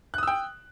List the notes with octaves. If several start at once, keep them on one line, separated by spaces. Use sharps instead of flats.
G5 D#6 E6 F#6